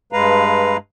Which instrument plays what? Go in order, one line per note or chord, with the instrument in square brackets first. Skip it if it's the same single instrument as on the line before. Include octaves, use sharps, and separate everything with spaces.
[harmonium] G2 G#3 B4 F5 A#5